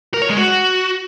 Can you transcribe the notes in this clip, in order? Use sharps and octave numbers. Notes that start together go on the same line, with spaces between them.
A#4
C#5
G#3
F#4